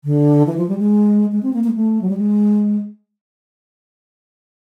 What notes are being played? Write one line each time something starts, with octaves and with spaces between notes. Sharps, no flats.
D3
E3
F3
G3
G#3
G#3
C4
A#3
A#3
G#3
A3
F#3
G3
G#3